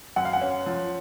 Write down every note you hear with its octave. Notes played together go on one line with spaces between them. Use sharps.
F#2 F#5
F5
F#5
C#4
F3